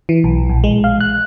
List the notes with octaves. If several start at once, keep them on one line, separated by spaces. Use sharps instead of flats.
E3
B1
A#1
G#3
F5
F#6